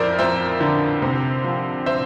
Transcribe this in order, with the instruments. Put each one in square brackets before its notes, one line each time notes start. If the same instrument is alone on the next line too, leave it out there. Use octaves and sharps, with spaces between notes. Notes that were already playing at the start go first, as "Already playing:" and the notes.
Already playing: [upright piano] F2 F3 A#4 C5 D5 E5
F2 C5 E5
D3
C3
F3
C5 E5